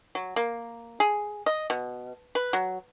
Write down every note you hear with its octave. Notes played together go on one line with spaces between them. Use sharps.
F#3
A#3
G#4
D#5
B2
B4
F#3